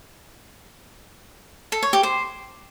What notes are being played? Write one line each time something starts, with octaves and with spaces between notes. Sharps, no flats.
A4
C#5
G4
C5